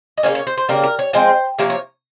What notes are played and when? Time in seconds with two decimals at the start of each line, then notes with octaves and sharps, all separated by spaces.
0.18 D#5
0.23 C#3 G3 A#3 C#4 C#5
0.35 C#5
0.47 C5
0.57 C5
0.68 C#3 G3 A#3 A#4
0.84 A#4
0.99 C#5
1.13 F3 G#3 C4 C5
1.59 C3 F3 A#3 C#5
1.70 C#5